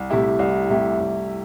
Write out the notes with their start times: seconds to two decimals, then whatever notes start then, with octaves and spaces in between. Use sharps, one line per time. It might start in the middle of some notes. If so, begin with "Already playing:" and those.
Already playing: C2
0.10 C3 A3 E4 G4
0.39 C2
0.70 C3 A3 E4 G4
1.00 C2